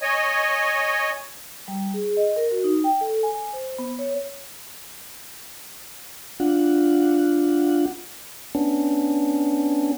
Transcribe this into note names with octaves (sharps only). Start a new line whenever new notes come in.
C#5 D#5 G#5
G3
G#4
D#5
A#4
F#4
D#4
G5
A4
G#5
C5
B3
C#5
D4 F4 F#5
B3 C#4 D4